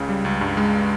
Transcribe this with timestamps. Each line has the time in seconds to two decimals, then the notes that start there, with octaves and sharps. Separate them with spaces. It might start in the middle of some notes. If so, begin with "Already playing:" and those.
Already playing: C#2 C#3
0.09 G3
0.25 C#2
0.41 G2
0.57 G#3